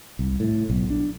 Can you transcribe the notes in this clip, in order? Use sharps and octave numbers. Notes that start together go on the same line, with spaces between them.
C2
A2
B1
D4